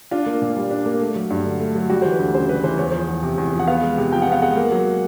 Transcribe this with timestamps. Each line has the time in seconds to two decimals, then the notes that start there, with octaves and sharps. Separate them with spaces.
0.11 D4 F4
0.26 A#3
0.42 A#2
0.56 G3
0.71 D4
0.86 A#3
1.01 A3
1.16 F#3
1.30 G2
1.45 D3
1.60 A3
1.75 F#3
1.90 G3 F#4
2.02 E3 C5
2.12 B4
2.19 D2
2.34 C#3 C5
2.49 G3 B4
2.64 E3 C5
2.78 E2 C#5
2.91 F3 C5
3.08 E2
3.23 C3
3.38 E2
3.53 F3
3.59 F#5
3.67 B3 F5
3.82 G#3
3.97 C3
4.12 F3 G5
4.22 F#5
4.27 B3 F5
4.42 G#3 F#5
4.57 A#3
4.72 F#3